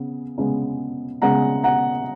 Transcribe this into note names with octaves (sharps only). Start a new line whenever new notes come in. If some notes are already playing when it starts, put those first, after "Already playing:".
Already playing: C#3 B3
C#3 G#3 B3
C#3 G#3 B3 F#5 A#5
F#5 A#5